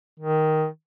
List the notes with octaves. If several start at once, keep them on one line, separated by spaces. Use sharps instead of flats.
D#3